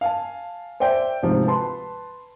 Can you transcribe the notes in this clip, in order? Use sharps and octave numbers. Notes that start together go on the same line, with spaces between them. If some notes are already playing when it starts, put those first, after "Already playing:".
F5 G#5 A5
C5 D5 E5 G5
D2 G#2 C3 F3
B4 A5 C6